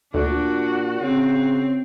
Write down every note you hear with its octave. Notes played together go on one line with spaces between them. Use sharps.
D2 A#2 D4 F#4
C#3 C4